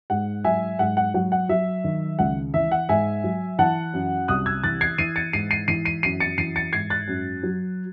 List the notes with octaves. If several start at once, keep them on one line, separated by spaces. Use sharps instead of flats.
G#2 F#5
F#3 E5 G#5
G#2 F#5
F#5
F#3 F#5
F#5
F#3 E5
D#3
C#2 F#5
E3 E5
F#5
G#2 E5 G#5
F#3
E3 F#5 A5
F#2
C2 D#6 F#6
E6 G#6
E3 F#6 A6
G#6 C7
E3 C7 D#7
A6 C#7
G#2 C7 D#7
C7 D#7
E3 C7 D#7
C7 D#7
F#2 C7 D#7
A6 C#7
E3 C7 D#7
A6 C#7
G#2 G#6 C7
F#6 A6
F#2
F#3